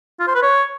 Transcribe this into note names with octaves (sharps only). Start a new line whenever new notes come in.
F4
C5
B4
C#5